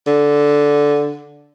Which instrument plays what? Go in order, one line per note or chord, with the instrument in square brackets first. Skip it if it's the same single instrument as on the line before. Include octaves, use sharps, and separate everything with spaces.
[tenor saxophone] D3